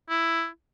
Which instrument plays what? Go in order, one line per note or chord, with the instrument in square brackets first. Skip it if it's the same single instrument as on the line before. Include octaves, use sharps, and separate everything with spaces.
[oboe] E4